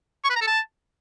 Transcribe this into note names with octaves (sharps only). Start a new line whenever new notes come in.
C#6
B4
A#5
A4
A5